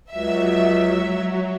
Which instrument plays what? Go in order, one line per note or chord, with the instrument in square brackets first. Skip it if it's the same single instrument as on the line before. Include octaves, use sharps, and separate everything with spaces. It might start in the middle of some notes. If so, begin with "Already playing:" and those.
[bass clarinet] C#2 [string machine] F#3 [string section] E5